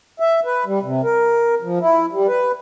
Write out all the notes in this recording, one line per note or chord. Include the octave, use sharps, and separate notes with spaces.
E5
B4
G3
C3
A#4
F3
E4
G3
B4